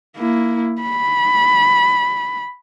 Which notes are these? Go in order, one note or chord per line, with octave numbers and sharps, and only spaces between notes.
A#3 E4
B5